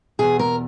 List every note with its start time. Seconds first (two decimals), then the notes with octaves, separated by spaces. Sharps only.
0.19 E2 B2 G#4
0.39 A#4